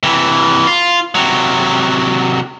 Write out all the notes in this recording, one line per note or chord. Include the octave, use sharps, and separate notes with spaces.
C3 E3
F4
C3 F#3